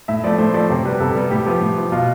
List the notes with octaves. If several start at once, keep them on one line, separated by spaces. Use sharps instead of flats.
A2 E5
F3 A3 D5
A2 C5
F3 A3 D5
C3 C5
G3 B3 B4
C3 A4
G3 B3
A2 G4
F3 B3
A2
F3 B3
B2 F4